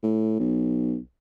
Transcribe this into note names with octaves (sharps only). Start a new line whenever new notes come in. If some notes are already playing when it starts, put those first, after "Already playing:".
A2
B1